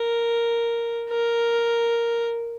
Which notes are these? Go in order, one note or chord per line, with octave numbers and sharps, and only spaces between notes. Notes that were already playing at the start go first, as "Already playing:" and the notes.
Already playing: A#4
A#4